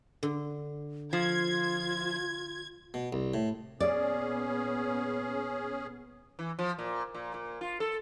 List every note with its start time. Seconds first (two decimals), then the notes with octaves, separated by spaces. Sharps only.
0.23 D3
1.13 F3 F4 G#6
2.94 B2
3.13 C2
3.34 A2
3.80 A#2 B3 C#4 G#4 D5
6.39 E3
6.59 F3
6.79 A#2
7.14 A#2
7.34 A#2
7.61 F4
7.80 A4